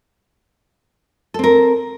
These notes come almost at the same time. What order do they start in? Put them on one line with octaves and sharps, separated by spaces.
A4 C4 A#4